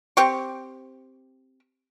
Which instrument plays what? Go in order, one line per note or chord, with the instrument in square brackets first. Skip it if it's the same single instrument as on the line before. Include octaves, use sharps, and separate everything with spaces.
[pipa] C4 G4 C#6